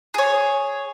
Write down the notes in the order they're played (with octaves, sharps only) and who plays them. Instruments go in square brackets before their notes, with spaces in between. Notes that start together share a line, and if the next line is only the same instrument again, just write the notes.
[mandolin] G#4 C#5